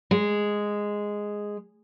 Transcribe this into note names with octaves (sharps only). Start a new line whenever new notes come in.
G#3